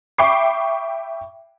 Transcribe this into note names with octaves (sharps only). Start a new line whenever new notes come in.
E5 G5 B5 C#6 D6 C7